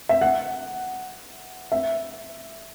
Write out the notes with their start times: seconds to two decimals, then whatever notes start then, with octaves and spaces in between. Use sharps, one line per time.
0.09 E5
0.21 F#5
1.72 E5